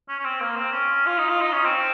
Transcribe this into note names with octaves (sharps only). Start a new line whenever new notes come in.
C#4
C#4
C4
A#3
C4
C#4
F4
D#4
F4
D#4
C#4
C4